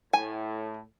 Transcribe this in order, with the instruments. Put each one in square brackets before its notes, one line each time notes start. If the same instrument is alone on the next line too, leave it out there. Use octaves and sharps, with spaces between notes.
[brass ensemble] A2 [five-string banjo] G#5